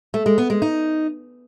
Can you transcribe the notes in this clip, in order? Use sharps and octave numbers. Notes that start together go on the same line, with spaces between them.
A3
G#3
B3
G#3
D#4